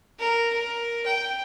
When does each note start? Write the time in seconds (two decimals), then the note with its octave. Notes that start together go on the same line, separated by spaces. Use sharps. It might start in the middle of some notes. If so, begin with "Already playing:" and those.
0.19 A#4
0.53 A#4
1.06 G5